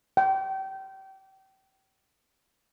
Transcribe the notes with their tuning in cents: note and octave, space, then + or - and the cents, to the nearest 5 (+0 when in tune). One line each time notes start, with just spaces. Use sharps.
G5 -30